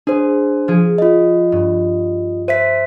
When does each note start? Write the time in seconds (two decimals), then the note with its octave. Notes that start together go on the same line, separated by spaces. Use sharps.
0.07 D4 G#4 C5
0.68 F3 G#4
0.98 F4 D#5
1.52 G2
2.48 C5 E5 B6 D#7